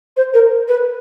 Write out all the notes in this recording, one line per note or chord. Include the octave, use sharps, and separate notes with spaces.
C5
A#4
B4